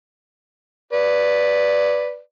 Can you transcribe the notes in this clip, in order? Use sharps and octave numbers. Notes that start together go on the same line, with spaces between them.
B4 D5